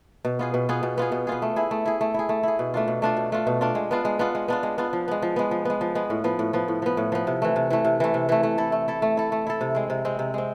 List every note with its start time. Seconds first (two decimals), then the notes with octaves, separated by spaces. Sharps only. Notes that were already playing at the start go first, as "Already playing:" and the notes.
0.25 B2
0.39 B3 F4 G#4
0.54 B2
0.69 B3 F4 G#4
0.83 B2
0.98 B3 F4 G#4
1.12 B2
1.27 B3 F4 G#4
1.42 A3
1.56 E4 G#4
1.71 A3
1.86 E4 G#4
2.01 A3
2.14 E4 G#4
2.29 A3
2.43 E4 G#4
2.59 B2
2.74 A3 D4 F4
2.88 B2
3.02 A3 D4 F4
3.17 B2
3.32 A3 D4 F4
3.47 B2
3.61 A3 D4 F4
3.75 G#3
3.91 B3 D4 F4
4.05 G#3
4.19 B3 D4 F4
4.35 G#3
4.48 B3 D4 F4
4.63 G#3
4.78 B3 D4 F4
4.93 F3
5.08 G#3 B3
5.22 F3
5.36 G#3 B3
5.51 F3
5.65 G#3 B3
5.81 F3
5.95 G#3 B3
6.10 A2
6.24 F3 B3
6.39 A2
6.53 F3 B3
6.68 A2
6.82 F3 B3
6.97 A2
7.12 F3 B3
7.27 C3
7.42 E3 A3
7.56 C3
7.70 E3 A3
7.85 C3
8.00 E3 A3
8.14 C3
8.29 E3 A3
8.43 A3
8.58 E4 A4
8.72 A3
8.88 E4 A4
9.02 A3
9.17 E4 A4
9.32 A3
9.47 E4 A4
9.61 C3
9.75 G#3 C4
9.90 C3
10.05 G#3 C4
10.19 C3
10.34 G#3 C4